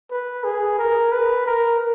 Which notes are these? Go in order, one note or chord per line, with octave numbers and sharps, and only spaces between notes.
B4
G#4
A#4
B4
A#4